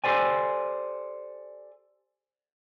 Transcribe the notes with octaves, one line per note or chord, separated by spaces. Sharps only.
G4 A4 C5 D5 G#5